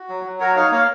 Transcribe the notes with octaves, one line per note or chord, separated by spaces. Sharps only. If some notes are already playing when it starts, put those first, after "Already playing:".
Already playing: F#4
F#3
F#3
F#4 A#4 C#5
D#4 C#5 F5
A#3 C#5 F5